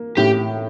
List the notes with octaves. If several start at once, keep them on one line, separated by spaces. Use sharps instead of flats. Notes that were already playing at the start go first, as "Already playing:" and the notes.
Already playing: A#3
A2 G4